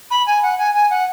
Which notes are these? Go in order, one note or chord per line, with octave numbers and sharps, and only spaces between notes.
B5
G#5
F#5
G#5
G#5
F#5